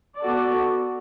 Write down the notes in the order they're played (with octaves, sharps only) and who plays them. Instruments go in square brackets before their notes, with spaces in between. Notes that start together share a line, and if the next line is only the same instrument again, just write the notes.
[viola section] B3 F#4 A4 D5